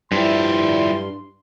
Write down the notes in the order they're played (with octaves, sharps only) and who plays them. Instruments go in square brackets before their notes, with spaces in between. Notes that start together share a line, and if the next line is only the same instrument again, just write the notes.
[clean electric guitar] G2 [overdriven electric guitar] F3 G3 [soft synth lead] E4 [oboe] C6